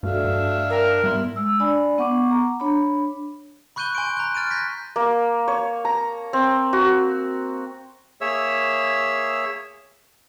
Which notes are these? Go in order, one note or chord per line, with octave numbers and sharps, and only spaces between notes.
G2 A3 D4 F#4 A4 E5 F5
G2
A#4 D5 G5
G#2 G3 B3 E4 C6
G#3 E6
D4 D5 G#5 B5
B3 F#5 C#6 D6
A#5
D4 C#5 B5
B5 C#6 F#6 G6 D#7 G7
G#5 C6 D7
A#5 F#6
F6 A6 D7 D#7
F#6 G6 A#6 B6
A#3
C#5
A#5
C4
F#4
A#3 G#4 C#5 E5 E6